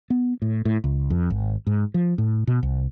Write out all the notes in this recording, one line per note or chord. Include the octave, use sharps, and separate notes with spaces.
B3
A2
A2
C#2
F2
G#1
G#2
F3
A2
B2
C2